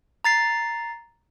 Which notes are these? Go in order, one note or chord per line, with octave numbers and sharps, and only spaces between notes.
A#5 A6 C7